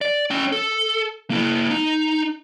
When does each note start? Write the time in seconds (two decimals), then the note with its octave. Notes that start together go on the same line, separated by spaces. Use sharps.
0.01 D5
0.30 C#4 G5
0.52 A4
1.30 A#3 E4
1.70 D#4